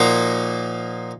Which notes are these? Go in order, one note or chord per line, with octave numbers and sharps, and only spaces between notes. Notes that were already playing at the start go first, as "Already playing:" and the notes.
Already playing: A#2 F3 A#3 D#4 F#4